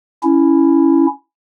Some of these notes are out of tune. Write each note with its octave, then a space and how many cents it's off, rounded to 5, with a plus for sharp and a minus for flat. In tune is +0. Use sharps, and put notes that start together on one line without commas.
C#4 +5 E4 +0